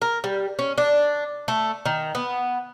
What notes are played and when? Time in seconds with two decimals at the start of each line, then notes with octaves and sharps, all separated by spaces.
0.02 A#4
0.24 G3
0.59 C#4
0.78 D4
1.48 A3
1.85 D#3
2.15 B3